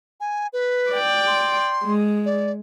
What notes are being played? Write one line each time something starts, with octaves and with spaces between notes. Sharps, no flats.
G#5
B4
D5 G5
C6
G#3
D5